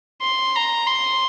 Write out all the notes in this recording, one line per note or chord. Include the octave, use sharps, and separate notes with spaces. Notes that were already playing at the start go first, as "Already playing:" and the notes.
C6
A#5
C6